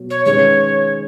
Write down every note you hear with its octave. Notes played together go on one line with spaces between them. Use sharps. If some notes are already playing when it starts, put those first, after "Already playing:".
Already playing: B2 F#3
C#5
D#3 G#3 C#4 B4 C#5